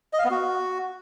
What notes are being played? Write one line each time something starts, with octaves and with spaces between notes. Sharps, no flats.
D#5
F5
B3
F#4